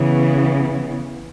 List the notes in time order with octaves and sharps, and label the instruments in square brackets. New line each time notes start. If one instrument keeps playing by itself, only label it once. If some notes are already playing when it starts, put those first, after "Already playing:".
Already playing: [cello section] C#3 E3 B3